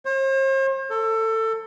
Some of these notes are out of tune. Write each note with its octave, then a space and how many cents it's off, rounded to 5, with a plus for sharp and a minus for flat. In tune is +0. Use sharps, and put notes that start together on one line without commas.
C5 +45
A4 +20